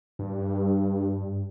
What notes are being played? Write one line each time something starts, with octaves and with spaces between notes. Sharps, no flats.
G2